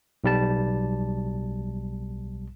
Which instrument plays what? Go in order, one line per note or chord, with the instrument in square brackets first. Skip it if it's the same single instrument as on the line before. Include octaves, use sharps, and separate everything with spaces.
[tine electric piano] B1 G3 A5